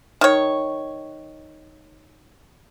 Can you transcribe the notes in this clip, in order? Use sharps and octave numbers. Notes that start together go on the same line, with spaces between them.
D#3 C#5